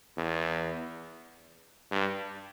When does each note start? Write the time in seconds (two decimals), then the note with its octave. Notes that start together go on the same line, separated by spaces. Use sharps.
0.17 E2
1.91 G2